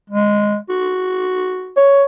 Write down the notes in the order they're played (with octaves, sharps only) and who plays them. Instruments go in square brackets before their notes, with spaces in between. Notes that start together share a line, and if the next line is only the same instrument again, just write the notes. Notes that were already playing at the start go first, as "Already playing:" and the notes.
[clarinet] G#3
F#4
[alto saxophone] C#5